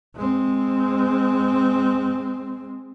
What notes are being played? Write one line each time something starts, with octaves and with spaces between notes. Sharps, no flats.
G#3 C4